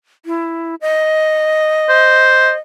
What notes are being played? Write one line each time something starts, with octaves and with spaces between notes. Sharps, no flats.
E4
D#5
C5